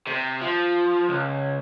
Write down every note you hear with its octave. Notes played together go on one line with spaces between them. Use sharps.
C3
F3
C#2